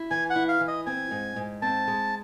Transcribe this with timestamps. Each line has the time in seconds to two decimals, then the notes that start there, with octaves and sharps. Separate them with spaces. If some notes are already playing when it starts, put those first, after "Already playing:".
Already playing: E4
0.11 E3 G#5
0.30 F#5
0.36 E4
0.48 F5
0.61 E3
0.68 D#5
0.86 C4 G#5
1.11 G#2
1.36 G#2
1.62 C4 A5
1.88 G#3